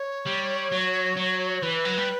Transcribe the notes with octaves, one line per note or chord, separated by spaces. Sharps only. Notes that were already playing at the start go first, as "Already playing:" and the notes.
Already playing: C#5
G3
F#3
F#3
E3 B4
F#3
G3